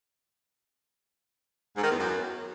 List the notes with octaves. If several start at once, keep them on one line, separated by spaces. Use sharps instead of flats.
G#2
D#3
E2
F#2